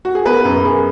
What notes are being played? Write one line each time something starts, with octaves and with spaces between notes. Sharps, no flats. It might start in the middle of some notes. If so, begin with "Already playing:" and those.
F#4
G#4
B3 B4
F#2
F#2 G#4